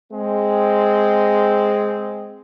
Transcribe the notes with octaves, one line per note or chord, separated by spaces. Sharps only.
G#3 C4